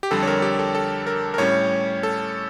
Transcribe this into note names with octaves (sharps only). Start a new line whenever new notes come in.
G4
F2 D3 G3 A4
C#5
A#4
G4
A4
A4
A#4
A#4
A2 G3 C#4 C#5
A4